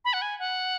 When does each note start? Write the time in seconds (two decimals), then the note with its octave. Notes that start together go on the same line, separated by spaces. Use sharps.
0.05 B5
0.13 F#5
0.22 G#5
0.39 F#5